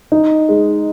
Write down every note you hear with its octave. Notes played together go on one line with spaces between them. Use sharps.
D#4
G#3